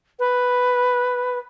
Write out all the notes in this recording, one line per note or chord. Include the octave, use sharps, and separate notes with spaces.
B4